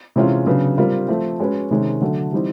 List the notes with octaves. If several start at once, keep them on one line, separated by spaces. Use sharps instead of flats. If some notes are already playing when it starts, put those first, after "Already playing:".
C3 E3 G#3 C#4 F4
C#3 F#3 B3 D4
G3 C4 F4 A#4
F3 A3 C4
G#3 C#4 F#4 B4
C3 D#3 G#3 C#4
D3 F#3 A3
E3 G3 C4 D#4